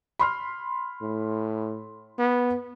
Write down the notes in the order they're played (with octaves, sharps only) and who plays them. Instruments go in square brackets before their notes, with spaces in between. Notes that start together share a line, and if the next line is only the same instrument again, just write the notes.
[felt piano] B5 C6 F6
[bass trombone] A2
B3